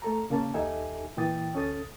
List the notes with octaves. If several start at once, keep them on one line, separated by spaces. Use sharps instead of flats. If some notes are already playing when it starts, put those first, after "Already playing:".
A3 A4 A#5
C#3 A#3 C#4 A5
D#2 D#4 G4 A4 E5 G#5
A#2 E3 G5 D#6 A6
D2 C#4 A4 D#6 A6